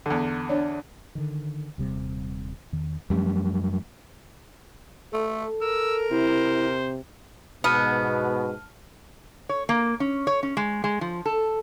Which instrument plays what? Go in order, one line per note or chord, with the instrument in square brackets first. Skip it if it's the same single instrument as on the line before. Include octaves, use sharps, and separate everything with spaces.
[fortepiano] E2 D3
[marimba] D4 C#5 D5
[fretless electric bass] D3 D#3
D#1 C3 G3
E2 D#3
[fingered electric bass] F#2 G3 [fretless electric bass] F3 A3 C#4
[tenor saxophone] A3 [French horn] A4
[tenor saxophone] A#4 [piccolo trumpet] E6
[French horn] C3 [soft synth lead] E4 [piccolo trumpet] C5
[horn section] G#2 B2 [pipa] B3 [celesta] A5 F6 D#7
[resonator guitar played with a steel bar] C#5
A#3
C#4
C#5
C#4
G#3
G#3
F3
A4